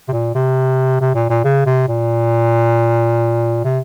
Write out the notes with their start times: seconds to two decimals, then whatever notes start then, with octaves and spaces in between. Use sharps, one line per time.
0.08 C3
0.12 A#2
0.35 C3
1.01 C3
1.15 A#2
1.30 A#2
1.44 C#3
1.66 C3
1.88 A#2
3.64 C3